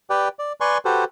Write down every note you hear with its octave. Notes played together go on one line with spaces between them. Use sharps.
G4 B4 D5 G5
D5
B4 D5 G#5 C6 C#6
F#4 G4 A4 B4 C5